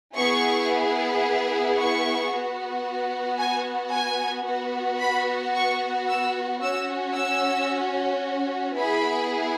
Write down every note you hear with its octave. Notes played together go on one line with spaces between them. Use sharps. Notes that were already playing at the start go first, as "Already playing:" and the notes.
B3 E4 G#4 C#6
C#6
B3 F#4
G#5
G#5
B3 F#4
B5
C#6
E6
C#4 F#4 E6
E6
B3 E4 G#4 B5